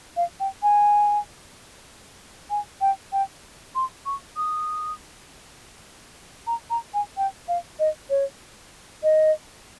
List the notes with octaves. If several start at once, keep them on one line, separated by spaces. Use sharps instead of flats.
F5
G5
G#5
G#5
G5
G5
C6
C#6
D#6
A#5
A#5
G#5
G5
F5
D#5
C#5
D#5